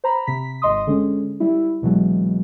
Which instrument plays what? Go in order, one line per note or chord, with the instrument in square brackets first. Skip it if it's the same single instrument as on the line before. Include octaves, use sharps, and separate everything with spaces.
[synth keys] C5 A#5 B5
C3 B6
G#1 D#5 C6 D#6
D3 G#3 C#4
G3 E4
C2 B2 E3 F#3 G#3